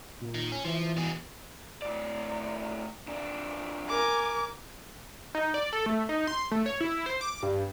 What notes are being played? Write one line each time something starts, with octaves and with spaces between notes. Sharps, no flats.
A#2
D#3
C#4
E3 F3
E3
B2 G#4
A2 D5
F2 D4
A#4 G#5 D6
D#4
D5
A4
A3
D#4
C6
A3
C#5
E4
C5
D6
G2